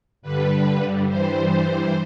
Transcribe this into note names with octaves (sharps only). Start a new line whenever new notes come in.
G2 D3 G3 B4
G2 E3 G3 C5